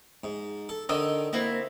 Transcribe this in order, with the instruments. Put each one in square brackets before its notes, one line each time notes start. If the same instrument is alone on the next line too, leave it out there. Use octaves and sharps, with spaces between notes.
[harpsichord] G#2
A4
[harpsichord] D3 D#3 [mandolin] D#5 E6
[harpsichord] A#3 [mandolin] C4 E4 F#4